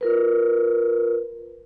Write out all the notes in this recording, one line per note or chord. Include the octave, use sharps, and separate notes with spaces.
F4 A#4 B4